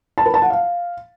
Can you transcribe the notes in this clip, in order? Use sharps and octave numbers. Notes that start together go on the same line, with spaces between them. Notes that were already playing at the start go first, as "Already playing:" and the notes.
A5
B4
A5
F#5
F5